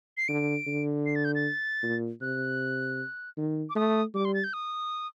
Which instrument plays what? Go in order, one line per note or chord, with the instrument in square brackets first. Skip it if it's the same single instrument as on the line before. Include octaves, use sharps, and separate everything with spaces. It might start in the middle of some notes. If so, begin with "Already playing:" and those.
[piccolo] C7
[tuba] D3 [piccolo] D7
[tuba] D3
[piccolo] C7
A6
G6
A6
[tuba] A#2
[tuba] C3 [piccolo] F#6
[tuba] D#3
[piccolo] D6
[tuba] A3 [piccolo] D#6
[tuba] G3 [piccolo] D6
[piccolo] C6
A6
G6
D#6